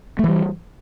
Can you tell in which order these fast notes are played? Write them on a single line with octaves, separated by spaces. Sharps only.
A3 E3 G3